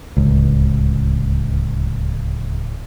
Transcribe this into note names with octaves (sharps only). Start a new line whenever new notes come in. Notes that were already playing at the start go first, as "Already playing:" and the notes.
D1 C#2